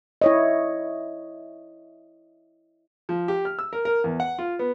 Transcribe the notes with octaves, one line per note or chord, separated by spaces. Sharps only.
E4 C#5 D#5
F3
G4
F6
E6
A#4
A#4
E2
F#5
F4
B3